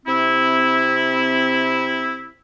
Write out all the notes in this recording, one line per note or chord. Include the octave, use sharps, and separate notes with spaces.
C3 C4 E4